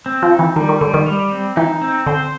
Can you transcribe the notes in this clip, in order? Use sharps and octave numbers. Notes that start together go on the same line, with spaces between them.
C4
F3
D#4
E3
D#3 G3
D#3
D3 G3
D#3
G3
C4
E3 D#4
C4
D3 C5